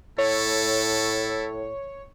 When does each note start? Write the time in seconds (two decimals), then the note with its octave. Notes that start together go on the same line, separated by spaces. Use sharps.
0.18 A2 E4 A4 C#5